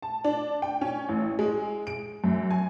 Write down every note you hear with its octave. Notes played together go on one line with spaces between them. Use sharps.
A5
D4
G5
C#4
A1
G#3
D7
F#2
G#5